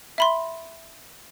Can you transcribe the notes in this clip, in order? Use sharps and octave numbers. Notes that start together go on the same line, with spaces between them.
E5 B5 C6